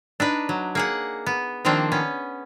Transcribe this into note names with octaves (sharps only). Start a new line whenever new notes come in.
D4 D#4 B4
F#3
A#3 G#4 F#5
B3
D#3 F3 A#3 C4 D4
B3 C#4